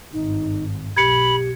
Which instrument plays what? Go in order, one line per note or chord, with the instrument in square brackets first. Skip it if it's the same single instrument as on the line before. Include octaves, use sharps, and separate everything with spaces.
[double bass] G#1 G2 [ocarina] D#4
[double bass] B1 [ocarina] G4 [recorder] B5 [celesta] G#6 C#7